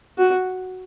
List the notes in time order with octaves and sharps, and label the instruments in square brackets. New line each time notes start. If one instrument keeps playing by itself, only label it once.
[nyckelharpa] F#4